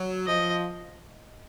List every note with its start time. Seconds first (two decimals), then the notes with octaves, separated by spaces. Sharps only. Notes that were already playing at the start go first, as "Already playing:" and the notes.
Already playing: F#3
0.26 F3 D#5